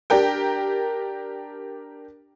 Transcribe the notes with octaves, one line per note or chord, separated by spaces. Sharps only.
D4 G4 A#4 G5